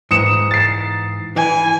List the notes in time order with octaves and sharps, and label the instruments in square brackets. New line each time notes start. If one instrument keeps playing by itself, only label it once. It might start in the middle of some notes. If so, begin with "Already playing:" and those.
[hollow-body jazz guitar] G#2 E3 [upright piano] D#6 C#7 E7
[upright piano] A6 C7
[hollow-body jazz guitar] E3 [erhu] G#5